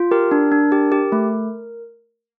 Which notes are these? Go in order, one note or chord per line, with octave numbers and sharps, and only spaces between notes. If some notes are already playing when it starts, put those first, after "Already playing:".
Already playing: F4
G4 A#4
D4
D4
G4
G4
A3